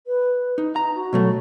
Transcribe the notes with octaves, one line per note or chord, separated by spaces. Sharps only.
B4
D#4
D#4 A#5
F#4
B2 F#3 A3